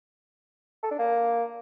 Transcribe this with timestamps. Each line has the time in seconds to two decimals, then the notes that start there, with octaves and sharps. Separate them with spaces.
0.83 A4
0.91 D4
0.99 A#3